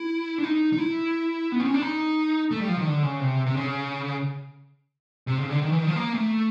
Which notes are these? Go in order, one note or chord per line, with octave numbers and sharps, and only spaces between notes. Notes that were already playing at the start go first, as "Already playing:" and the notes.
Already playing: E4
D4
D#4
D#4
E4
B3
C4
C#4
D4
D#4
A3
G3
F3
D#3
D3
C#3
C3
C3
C#3
C3
C#3
D3
D#3
E3
D#3
F3
A#3
A3